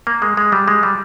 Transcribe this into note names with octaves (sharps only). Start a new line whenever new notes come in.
A#3
G#3
G#3
G3
G#3
G3